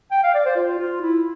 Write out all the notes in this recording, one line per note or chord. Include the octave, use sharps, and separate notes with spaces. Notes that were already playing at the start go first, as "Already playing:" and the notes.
G5
F5
D5
C5
F4
F4
E4